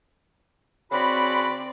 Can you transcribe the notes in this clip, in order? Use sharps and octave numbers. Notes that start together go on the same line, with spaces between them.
C#3 C4 F#4 D5 B5